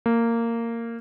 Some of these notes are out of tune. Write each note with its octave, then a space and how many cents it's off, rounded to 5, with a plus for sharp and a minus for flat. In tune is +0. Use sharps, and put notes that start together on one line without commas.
A#3 -15